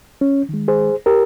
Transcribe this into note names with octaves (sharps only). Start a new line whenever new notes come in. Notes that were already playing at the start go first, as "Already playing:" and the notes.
C#4
D#3 G#3
G#4 C5
G4 A#4